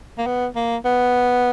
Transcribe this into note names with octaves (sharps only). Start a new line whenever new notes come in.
A#3
B3
A#3
B3